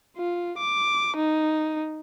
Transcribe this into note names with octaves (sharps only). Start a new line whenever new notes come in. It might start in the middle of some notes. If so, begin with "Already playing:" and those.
F4
D6
D#4